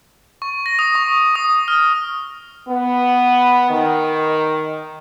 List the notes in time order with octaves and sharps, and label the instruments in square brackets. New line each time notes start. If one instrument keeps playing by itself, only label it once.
[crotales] C#6
A#6
D#6
C#6
D#6
F6
[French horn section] B3
D#3